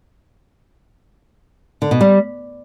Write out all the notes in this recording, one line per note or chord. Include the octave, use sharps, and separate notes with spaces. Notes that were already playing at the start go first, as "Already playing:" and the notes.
D3
B2
G3